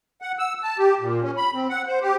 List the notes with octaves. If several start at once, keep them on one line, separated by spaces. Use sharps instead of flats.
F#5
E6
A5
G4
A#2
C#4
B5
C4
F#5
C5
G4